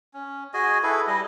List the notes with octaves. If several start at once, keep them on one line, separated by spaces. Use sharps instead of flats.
C#4
F#4 G#4 D#5 G#5
E4 G#4 A4 B4
G3 D#5